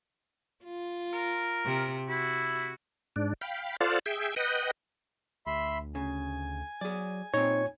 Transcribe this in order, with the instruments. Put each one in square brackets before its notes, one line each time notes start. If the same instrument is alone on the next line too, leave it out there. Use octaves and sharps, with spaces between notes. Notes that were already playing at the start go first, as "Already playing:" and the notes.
[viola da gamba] F4
[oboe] A#4
[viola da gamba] C3
[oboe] E4 [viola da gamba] F#4
[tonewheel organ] G#2 D4
F5 G5 B5
F4 A4 C5 D5 F5 F#5
G#4 E5 G5
B4 D#5 F#5 G5
[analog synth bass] D2 [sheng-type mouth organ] E5 B5 C6
[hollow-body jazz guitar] C#3 [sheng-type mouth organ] G#5
[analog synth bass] F#3 [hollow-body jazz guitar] G#4 D5
[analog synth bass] A#2 [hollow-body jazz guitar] C4 D#4 [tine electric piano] C#5